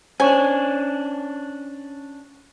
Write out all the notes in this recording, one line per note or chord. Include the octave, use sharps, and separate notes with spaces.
C#4 D4 C5 C#5 G#5 C#6